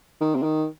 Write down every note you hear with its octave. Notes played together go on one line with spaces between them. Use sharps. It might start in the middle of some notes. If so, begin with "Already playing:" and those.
D#3
C3
D#3